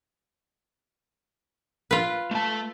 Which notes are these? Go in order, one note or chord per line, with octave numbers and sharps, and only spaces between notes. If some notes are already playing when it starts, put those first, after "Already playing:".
F4 B4
A3 A5